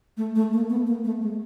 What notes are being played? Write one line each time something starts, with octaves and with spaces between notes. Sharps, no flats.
A3
A3
A#3
B3
A#3
A3
G#3